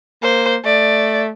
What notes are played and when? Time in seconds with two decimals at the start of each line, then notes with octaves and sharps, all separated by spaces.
0.23 A#3 C5
0.65 A3 D5